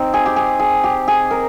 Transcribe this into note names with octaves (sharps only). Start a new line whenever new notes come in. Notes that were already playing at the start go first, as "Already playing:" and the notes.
Already playing: C4 D#4
G#4
G4
G#4
G#4
G4
G#4
A#4